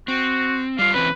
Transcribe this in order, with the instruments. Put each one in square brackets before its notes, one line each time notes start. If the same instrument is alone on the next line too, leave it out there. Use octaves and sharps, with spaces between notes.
[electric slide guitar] C4 [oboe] F#4
[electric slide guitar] G3 F4 [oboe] F5
[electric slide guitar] E3 C4 C#4 [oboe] B4